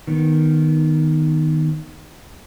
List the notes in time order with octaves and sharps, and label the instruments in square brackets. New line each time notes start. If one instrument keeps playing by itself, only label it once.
[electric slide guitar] D#3 B3